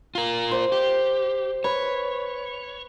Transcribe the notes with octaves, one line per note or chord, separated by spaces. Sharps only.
F4 A#4
C5
G4
B4 C#5